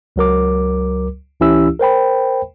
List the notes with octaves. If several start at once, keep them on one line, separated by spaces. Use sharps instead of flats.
C#2 F#3 A#4 D6
C#2 E3 C#4 E4 G4 E6
A#4 C5 G5 B5